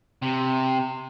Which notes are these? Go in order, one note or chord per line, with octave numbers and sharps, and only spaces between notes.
C3